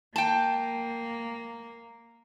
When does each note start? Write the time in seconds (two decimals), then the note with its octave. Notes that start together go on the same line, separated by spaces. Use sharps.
0.16 A#3 G5 A5